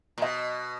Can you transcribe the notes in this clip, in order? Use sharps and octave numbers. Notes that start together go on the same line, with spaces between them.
A#2
B2 D#5